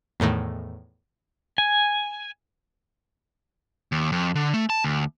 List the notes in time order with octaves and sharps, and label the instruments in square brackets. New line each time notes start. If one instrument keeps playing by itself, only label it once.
[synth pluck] E2 A2 D#3 A3
[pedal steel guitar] G#5
[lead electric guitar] D#2
F2
D3
A3
A5
D2